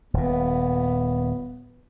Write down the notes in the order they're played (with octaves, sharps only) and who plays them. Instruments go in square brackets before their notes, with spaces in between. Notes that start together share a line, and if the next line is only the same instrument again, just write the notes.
[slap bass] D#1 A#2 [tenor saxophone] B3